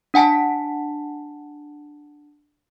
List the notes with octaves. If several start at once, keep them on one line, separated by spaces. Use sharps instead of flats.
D4 F#5 G#5 A5 B6